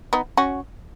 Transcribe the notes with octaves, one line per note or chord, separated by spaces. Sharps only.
B3 D#4
C#4 F#4